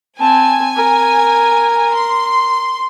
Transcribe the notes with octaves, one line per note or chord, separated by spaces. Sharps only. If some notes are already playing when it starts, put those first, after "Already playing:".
C4 G#5 A5
A#4
C6